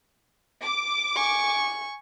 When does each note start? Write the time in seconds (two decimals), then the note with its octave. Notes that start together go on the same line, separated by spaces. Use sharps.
0.63 D6
1.16 G#5 C#6